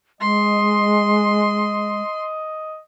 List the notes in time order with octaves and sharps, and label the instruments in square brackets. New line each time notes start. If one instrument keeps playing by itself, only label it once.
[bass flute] G#3 [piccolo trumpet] D#5 [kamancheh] C6